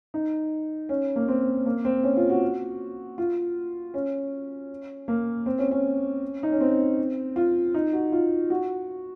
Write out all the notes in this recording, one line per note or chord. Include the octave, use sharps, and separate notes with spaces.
D#4
C#4
A#3
C4
A#3
C4
C#4
F4
F#4
F4
C#4
A#3
C4
C#4
C#4
D#4
C#4
C4
F4
D#4
F#4
F4
F#4